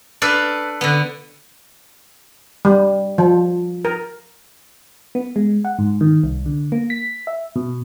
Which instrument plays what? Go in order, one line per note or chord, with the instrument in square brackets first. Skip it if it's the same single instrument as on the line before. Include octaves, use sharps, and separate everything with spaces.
[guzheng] D4 A4 B4 F5
D3 B3
[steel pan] G3
F3
A#4
[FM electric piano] B3
G#3
F#5
G#2
D#3
C2
D3
A#3
B6
E5
B2